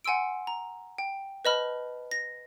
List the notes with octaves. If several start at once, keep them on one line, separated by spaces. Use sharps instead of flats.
F#5 G#5 C6 E6 D7
A#5
G5
B4 C5 D#5 A5 B5 F6
A#6